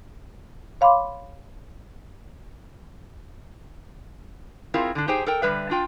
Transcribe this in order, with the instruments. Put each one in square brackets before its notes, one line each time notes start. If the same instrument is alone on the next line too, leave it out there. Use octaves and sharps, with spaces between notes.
[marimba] C#5 F5 B5 C6 D6
[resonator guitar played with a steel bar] C4 E4 F4 G#4 A#4
D3 D4
D#4 G4 G#4 C5 G5
A4 A#4 G5
D3 G3 B4 E5
D4 F4 G5